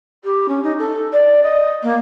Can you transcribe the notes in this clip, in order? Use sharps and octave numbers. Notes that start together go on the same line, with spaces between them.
G4
C#4
D#4
A4
D5
D#5
A#3